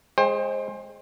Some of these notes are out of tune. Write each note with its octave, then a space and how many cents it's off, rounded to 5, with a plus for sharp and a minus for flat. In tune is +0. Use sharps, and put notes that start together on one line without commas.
G#3 +0 C5 +25 G5 +30